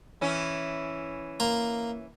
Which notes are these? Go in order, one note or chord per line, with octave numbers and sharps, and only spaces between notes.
E3 C#4 E4
A#3 A#5 C6